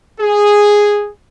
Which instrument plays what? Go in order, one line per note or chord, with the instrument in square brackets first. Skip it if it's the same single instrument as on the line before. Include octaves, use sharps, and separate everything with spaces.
[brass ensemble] G#4